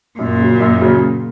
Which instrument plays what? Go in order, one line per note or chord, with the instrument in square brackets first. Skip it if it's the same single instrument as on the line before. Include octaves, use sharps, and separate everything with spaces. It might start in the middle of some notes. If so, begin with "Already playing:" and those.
[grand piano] F#2 [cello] A#2
[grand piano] C#3 F#3
F#2
C#3 F#3